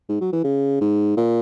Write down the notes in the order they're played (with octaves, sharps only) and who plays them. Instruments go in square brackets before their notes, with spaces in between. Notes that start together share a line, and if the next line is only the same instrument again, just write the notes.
[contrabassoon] G#2
F#3
E3
C#3
G#2
A#2